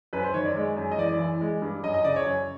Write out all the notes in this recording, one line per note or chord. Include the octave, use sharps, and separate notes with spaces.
F#2 B4
C5
D#3 C#5
D5
G#3
F#2
D#5
E3 D5
E3
G#3
G2
F#2 D#5
D#5
C#3 D5
C#5
F#2